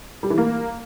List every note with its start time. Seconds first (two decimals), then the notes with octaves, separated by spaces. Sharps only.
0.23 G3
0.30 E3
0.38 A#3